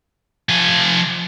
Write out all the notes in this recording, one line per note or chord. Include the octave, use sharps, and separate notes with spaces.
F3 G#5